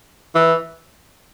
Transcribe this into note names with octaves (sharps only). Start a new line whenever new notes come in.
E3